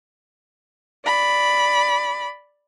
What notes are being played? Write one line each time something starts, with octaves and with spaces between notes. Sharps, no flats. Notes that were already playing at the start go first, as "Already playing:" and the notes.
D5 B5